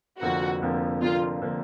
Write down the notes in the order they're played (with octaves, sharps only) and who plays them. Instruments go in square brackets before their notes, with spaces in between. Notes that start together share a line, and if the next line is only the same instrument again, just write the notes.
[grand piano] F1 F2 D3 F3 A#3 [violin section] F#4
[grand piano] F1 F2 D3 F3 A#3
[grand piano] F1 F2 D3 F3 A#3 [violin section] F4
[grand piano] D3 F3 A#3